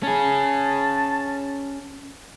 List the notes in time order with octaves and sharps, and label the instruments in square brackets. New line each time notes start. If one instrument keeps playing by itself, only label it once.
[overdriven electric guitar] C#4 G#4 [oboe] A5